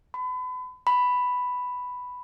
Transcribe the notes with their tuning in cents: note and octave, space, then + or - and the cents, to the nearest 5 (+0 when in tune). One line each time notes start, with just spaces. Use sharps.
B5 +35
B5 +5